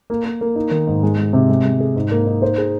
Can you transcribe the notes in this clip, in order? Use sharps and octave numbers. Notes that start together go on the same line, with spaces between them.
A#3
A#3
A#3
D#4
D#3
G#2
G#3
G#3
C3
G#3
G#3
G#4
G#2
A#3
D#4
C5
G#4